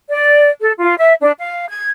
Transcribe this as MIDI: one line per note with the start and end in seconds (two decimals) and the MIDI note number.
0.09 0.50 74
0.61 0.72 69
0.80 0.94 65
0.98 1.14 76
1.22 1.32 62
1.38 1.65 77
1.68 1.90 92